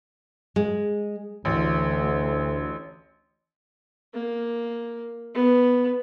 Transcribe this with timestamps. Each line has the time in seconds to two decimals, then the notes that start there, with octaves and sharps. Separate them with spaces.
0.56 G#3
1.45 A1 D2
4.14 A#3
5.34 B3